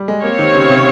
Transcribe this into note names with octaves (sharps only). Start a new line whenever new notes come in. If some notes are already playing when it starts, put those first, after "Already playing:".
Already playing: G3
G#3
A#3 C4 G4 C#5 F5
D#3
C#3
C3